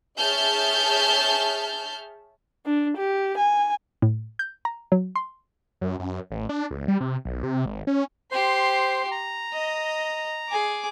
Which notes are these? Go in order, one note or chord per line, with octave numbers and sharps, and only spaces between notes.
G#4 C#5 E5 A5 F6 G6
D4
G4
G#5
A2
G6
A#5
F#3
C6
F#2
F#2
A1
D4
C#2
G3
C3
B1
C3
G#1
C#4
G4 C5 C6
A#5
D#5
G#4 D6